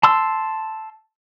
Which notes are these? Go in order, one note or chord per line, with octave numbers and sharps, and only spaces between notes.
A5 C6 E6